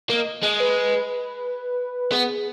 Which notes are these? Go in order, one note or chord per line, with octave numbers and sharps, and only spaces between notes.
A#3 D#5
G#3 D#5
B4
B3 G#4